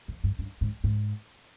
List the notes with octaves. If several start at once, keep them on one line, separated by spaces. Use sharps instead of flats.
F2
G2
G2
G#2
G#2